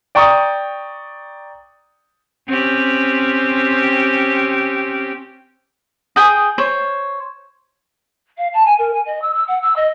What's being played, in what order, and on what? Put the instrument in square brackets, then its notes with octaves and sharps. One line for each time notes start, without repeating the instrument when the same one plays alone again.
[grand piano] D5 G5 A#5 C#6 D#6
[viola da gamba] C4 C#4 G4
[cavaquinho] G#4 G5 D#6
C5 C#5
[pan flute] F5
A5
G#5
A#4
G#5
D#5
E6
E6
F#5
E6
D#5